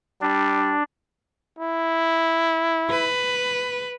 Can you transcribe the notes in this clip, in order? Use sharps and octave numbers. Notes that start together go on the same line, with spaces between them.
G3 D4
E4
B4